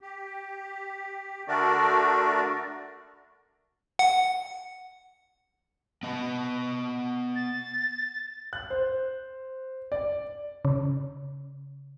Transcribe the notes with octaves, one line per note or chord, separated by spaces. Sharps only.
G4
D3 A3 D4 F#4 A#4 D5
F#5
B3 D#5
A6
F#6
C5
D5
C#3